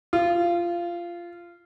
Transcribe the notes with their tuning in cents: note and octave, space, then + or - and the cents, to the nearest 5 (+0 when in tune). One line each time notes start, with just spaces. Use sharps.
F4 -15